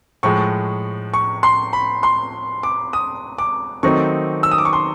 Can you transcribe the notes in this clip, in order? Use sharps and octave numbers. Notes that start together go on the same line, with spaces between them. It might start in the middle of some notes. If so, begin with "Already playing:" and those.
A2 F3 G#3 C#6
C#6
C6
B5
C6
D6
D#6
D6
D#3 F#3 A3 C4 D#4 C#6
E6
D#6
D6
C#6
C6